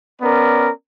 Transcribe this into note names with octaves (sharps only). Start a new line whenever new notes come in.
B3 C#4 A#4 D5